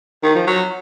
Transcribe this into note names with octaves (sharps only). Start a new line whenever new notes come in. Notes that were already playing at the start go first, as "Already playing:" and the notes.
D#3
F3
F#3